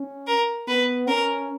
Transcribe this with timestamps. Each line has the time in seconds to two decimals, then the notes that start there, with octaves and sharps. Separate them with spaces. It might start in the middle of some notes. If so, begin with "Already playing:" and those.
Already playing: C#4
0.27 A#4
0.68 B3 B4
1.08 C#4 A#4